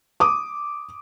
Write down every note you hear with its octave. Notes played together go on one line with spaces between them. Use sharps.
D6 D#6